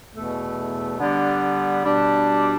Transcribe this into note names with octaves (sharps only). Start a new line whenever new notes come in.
E2 B2 A3
D3 G3 B3 D4
B2 G3 D4